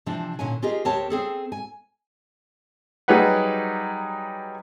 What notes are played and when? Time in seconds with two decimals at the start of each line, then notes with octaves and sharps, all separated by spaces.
0.06 C3 E3 F3 D4
0.39 A#2 D3 C#4 G#5
0.62 F4 G4 G#4 A#4 D#5
0.85 D2 C4 G4 A#4 C#5 A5
1.10 C4 G#4 A4
1.52 G#5
3.08 F#3 G3 D#4 G#4 B4 F#5